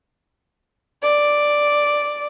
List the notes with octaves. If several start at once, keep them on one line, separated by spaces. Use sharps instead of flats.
D5